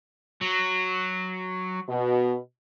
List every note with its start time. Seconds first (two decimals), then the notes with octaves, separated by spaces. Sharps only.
0.42 F#3
1.88 B2